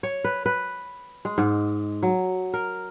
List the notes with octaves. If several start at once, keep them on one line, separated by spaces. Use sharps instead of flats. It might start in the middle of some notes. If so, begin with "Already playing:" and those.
C#5
B4
B4
G#3
G#2
F#3
A#4